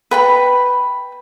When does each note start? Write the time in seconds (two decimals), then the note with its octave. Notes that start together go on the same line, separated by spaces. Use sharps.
0.11 B4 G5 B5